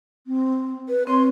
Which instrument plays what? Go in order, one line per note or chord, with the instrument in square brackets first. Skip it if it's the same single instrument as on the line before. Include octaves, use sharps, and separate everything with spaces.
[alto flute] C4
[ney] B4
[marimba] C4 [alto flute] C#5 [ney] C6